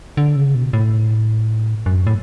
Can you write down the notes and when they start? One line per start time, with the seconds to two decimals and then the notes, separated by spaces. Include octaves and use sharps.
0.17 D3
0.36 C#3
0.55 B2
0.73 A2
1.86 F#2
2.07 A2